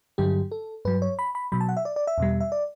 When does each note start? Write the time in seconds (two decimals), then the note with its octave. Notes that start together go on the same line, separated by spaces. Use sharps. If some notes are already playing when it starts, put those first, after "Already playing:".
0.18 G2 D3 F#3 G4
0.52 A4
0.85 G2 F#3 B4
1.02 C#5
1.19 B5
1.35 B5
1.52 B2 F#3 B5
1.61 A5
1.69 F#5
1.77 E5
1.85 D5
1.96 D5
2.07 E5
2.18 E2 B2 G3
2.40 E5
2.52 D5